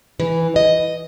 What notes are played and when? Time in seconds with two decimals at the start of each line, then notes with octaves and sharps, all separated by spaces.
0.20 E3
0.56 D#5